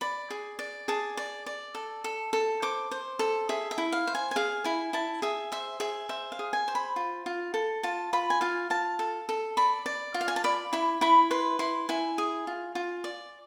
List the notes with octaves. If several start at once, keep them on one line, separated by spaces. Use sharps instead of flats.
D5 B5
G#4
D5
G#4 A5
D5
D5
A4
A4
A4
C5 D6
C5
A4
G#4 E5
E5
E4
F5
C5
G#5
G#5
G#4 F5
E4 G#5
E4 A5
G#4 E5
C5 E5
G#4 E5
C5 E5
F5
G#4
G#5
C5
B5
F4
F4
A4
F4 A5
F4 B5
G#5
F4 F5
F4 A5
A4
A4
D5 B5
D5
F4
F5
G#5
A5
D5 B5
E4 B5
E4 B5
B4 C6
E4 C6
E4 G#5
G#4
F4
F4
D5